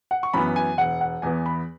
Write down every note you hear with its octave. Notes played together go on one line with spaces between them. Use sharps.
F#5
C#6
F#2 E3 B3 B5
G#5
E1 F#5
F#5
E2 E3 B3 G#5
B5